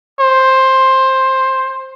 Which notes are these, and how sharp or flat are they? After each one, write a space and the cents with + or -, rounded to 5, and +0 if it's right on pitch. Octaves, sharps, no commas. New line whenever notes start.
C5 +10